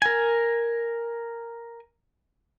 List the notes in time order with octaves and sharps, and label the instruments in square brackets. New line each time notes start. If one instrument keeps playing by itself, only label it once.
[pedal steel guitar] A#4 G#5